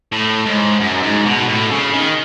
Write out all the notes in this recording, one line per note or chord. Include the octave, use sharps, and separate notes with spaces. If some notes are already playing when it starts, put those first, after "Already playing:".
A2
G#2
F#2
G#2
B2
A2
C#3
D#3